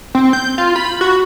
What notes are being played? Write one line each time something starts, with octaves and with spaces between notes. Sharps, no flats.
C4
G6
F4
B5
F#4